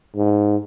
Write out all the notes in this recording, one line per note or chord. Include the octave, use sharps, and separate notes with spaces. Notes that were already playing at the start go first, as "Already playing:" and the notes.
G#2